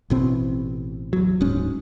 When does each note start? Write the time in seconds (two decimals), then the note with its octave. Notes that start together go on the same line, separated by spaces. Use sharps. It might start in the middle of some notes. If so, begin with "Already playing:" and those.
0.10 A1 B2 C4
1.13 E2 F#3
1.41 D1 G#2 C#4